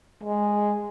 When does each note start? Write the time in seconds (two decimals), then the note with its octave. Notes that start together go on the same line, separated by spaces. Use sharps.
0.23 G#3